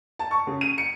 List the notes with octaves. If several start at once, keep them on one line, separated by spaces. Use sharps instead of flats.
A5
C#6
C#3
D#7
C#7